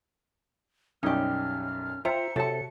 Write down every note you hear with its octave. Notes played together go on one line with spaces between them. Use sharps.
B1 F#2 G3 C#4 D#4 G4 F6
F4 C5 E5 G5 A#5 C#7
C3 F#4 A4 C#5 E5 A5